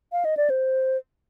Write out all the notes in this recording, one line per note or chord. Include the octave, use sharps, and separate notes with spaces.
F5
D#5
D5
C5